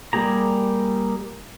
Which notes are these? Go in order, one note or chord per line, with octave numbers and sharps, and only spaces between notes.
G3 A#3 G4 G#4 A#5